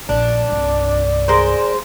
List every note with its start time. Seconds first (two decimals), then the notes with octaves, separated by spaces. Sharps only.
0.09 A#1 A#2 D4 D5
0.50 C2 G2
1.28 G#3 A#4 C5